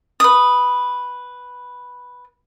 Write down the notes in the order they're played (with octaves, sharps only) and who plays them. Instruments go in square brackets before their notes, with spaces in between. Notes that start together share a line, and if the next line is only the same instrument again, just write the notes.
[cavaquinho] B4 D#6